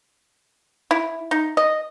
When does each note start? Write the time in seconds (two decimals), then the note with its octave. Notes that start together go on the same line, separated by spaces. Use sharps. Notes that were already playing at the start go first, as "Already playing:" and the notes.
0.91 E4
1.31 D#4
1.57 D#5